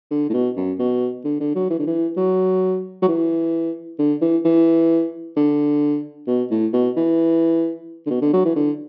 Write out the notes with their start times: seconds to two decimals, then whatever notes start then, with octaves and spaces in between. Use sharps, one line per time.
0.11 D3
0.29 A2
0.33 B2
0.56 F#2
0.79 B2
1.25 D3
1.40 D3
1.55 F#3
1.70 E3
1.79 D3
1.87 E3
2.17 F#3
3.02 F#3
3.08 E3
3.99 D3
4.21 E3
4.45 E3
5.37 D3
6.27 B2
6.51 A2
6.73 B2
6.97 E3
8.06 D3
8.11 B2
8.22 D3
8.33 F#3
8.45 E3
8.56 D3